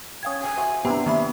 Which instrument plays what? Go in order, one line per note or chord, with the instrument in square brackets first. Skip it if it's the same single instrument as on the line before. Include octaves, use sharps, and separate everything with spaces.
[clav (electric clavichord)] C#4 F5 G5 [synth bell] D#6 G#6
[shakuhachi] G#5
[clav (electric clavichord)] F#4 C5 E5
[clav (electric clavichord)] C3 E4 [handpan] B3 D4 [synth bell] G4 A#5
[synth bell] D#3 A#3 B5 [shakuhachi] E5